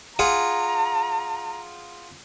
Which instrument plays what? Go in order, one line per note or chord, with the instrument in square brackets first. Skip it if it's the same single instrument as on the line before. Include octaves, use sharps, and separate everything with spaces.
[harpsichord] F4 G#4 F#5 [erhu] A#5